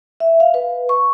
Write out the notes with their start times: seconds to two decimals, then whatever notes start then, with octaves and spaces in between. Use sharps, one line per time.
0.20 E5
0.40 F5
0.54 B4
0.89 C#6